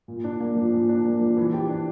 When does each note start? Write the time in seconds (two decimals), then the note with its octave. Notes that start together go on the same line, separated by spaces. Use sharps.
0.08 A#2
0.24 D4
0.40 A#3
0.56 F3
0.72 A#2
0.89 D4
1.05 A#3
1.21 F3
1.37 E3
1.53 G4
1.69 D4